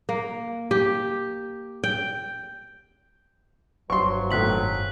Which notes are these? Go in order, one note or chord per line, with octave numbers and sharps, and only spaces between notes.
A#3
G4
G5
F#1 G2 B2 F3 F#3 C6 C#6
G#1 A2 F#6 B6 F#7